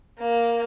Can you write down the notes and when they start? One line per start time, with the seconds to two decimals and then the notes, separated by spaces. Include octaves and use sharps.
0.19 A#3